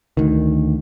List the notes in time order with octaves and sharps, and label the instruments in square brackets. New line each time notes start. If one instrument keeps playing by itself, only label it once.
[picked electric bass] D2 D#3